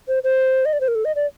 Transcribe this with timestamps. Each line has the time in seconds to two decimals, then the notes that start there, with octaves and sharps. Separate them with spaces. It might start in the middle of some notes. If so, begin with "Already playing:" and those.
0.08 C5
0.24 C5
0.65 D#5
0.73 D5
0.81 C5
0.88 A#4
0.95 A4
1.05 D#5
1.16 D5